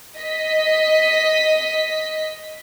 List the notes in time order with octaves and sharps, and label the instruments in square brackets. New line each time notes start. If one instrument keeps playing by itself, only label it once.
[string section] D#5 B6